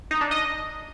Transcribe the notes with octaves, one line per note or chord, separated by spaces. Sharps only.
D#4
D4
D#5